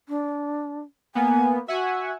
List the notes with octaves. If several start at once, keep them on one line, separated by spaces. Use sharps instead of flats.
D4
A#3 B3 G#5
F#4 E5 F#5 G#5